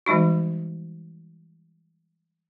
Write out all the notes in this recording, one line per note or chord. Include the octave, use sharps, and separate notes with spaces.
E3 G3 G#3 D#4 F#4